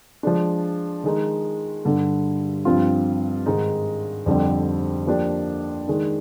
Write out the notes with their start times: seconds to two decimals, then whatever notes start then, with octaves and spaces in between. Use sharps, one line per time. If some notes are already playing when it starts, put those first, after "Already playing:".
0.23 F3 G#3 D4
1.04 D#3 G#3 D#4
1.85 G2 D3 G3
2.65 G2 F3 C4 F4
3.46 G#2 D#3 G#3 D#4
4.26 F2 D3 G3 C4 G4
5.07 F3 A#3 D4 G4
5.88 D#3 G#3 D4